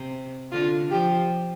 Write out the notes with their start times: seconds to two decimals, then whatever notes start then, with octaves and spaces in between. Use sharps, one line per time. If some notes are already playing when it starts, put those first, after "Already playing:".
Already playing: C3
0.52 D3 F4
0.91 F3 G4